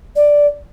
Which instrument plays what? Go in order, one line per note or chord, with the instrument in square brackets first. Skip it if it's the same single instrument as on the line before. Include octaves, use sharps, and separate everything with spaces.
[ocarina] D5